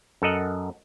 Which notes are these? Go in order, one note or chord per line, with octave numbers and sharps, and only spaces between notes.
F#2 A4 A#4 D#5 F#5